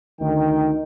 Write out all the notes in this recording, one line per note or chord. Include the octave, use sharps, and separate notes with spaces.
D2 D#3 G5